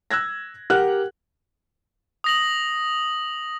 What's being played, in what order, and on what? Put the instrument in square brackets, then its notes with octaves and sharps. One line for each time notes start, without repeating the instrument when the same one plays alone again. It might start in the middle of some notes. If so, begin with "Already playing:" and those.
[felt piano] E6 F#6 G#6 A#6
G4 A#4 F#5 F6 F#6
[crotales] D#6 A#6 F#7